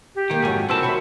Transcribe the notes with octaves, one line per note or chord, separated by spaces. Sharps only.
G4
D#3 G#3 A#3 G5
F2 G#2 D#3 F#3 G#4 F#5
C2 D#3 C4 E4 C5 A5 B5
C3 D#3 F#4 C#5 E5 B5